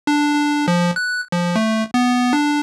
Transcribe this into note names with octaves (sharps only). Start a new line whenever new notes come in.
D4
D4
F3
F#6
F3
A3
B3
D4